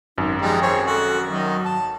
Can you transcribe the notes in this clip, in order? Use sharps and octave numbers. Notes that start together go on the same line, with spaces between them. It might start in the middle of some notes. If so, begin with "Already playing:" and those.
G#1 F#2 D#4
F3 G3 G#3 D#4
C4 G#4 C#5
F#4 A4
D#3 F#3 D#5
A5